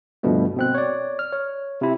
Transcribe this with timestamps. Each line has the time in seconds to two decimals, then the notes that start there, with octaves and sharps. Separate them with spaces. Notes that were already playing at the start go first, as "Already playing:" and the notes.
0.23 C2 G2 B2 D3 F3 A3
0.57 B2 C4 F#6
0.75 C#5 D5
1.19 F6
1.32 C#5
1.81 C3 E4